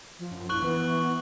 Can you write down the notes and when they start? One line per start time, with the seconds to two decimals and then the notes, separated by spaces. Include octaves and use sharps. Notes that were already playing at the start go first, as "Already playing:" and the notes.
0.18 F3
0.31 F#2
0.49 A#1 E4 C#6 F#6 F#7
0.62 E3 B3